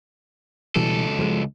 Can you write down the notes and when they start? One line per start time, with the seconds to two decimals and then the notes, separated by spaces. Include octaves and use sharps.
0.76 C#2 B2 E3 G3 A4
1.19 F3 G3 G#3